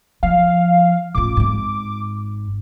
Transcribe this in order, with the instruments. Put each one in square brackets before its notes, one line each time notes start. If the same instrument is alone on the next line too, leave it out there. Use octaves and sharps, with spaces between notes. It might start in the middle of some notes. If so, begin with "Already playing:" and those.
[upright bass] F3 [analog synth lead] F5
[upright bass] A1 F4 [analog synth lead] D6
[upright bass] G#1 G#2